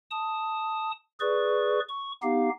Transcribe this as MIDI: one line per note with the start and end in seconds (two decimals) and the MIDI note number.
0.11 0.91 81
0.11 0.91 87
1.20 1.80 68
1.20 1.80 71
1.20 1.80 74
1.20 1.80 85
1.89 2.12 85
2.22 2.49 59
2.22 2.49 63
2.22 2.49 67
2.22 2.49 77